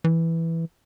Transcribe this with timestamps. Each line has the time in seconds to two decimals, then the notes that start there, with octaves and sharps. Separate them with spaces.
0.04 E3